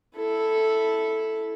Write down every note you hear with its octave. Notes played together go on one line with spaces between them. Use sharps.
E4 A4